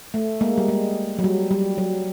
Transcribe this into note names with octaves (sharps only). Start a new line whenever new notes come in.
A3
G#3 A#3
G3
G#3
F#3
G3
G3
F#3